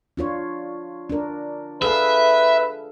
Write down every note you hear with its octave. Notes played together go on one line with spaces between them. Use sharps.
D4 F4 C#5
D4 A#4
G#4 A4 B4 E5 F5